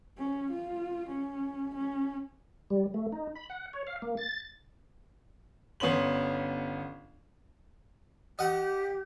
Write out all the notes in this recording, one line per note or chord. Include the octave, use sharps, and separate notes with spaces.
C#4
F4
C#4
C#4
G3
A3
D#4
B5
F#5
C#5
F5
A#3
A6
G1 B3 C#4 C6 F#7
G4 D#5 F#5